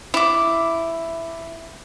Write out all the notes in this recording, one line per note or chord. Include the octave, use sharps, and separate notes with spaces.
E4 D6